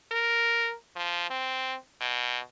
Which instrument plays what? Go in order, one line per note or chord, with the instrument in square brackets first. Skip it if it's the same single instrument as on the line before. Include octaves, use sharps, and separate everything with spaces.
[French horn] A#4
F3
C4
B2